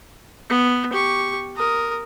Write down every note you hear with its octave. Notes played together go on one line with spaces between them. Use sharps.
B3
G4 C#6
A#4 D#6